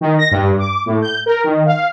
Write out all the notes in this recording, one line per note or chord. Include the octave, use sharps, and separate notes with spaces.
D#3
A#6
G2
D6
A2
G6
A#4
D#3
F5